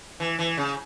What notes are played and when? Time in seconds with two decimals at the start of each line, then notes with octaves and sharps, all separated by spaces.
0.20 E3
0.39 E3
0.57 C#3